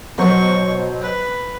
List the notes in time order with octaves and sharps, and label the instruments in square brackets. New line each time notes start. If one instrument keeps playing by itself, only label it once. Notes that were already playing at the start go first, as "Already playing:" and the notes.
[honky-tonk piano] B2 F#3 C5 [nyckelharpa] C#6
[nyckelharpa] B4